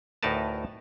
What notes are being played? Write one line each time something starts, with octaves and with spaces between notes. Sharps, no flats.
D2 A2 D#4 A#4 B4 A5